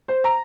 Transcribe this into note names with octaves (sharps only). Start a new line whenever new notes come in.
C5
A#5